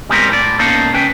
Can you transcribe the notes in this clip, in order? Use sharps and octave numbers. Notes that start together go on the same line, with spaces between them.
G3 G#3 B3 C4 A#4
A2 D5
B2 A#3 C#4 D#4 A4 F5
C#2 C#4 B4 G5